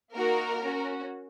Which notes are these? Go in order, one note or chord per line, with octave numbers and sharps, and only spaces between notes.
A#3 D#4 F#4 A#4
C#4 F#4